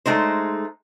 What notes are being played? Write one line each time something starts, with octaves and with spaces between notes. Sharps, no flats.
G#3 A3 D#4 C5